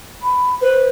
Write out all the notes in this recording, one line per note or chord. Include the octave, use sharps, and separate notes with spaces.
B5
B4 C5